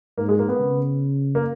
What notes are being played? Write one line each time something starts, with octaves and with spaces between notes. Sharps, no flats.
G#2 A#3
G#3
A#3
B3
C#3
A#3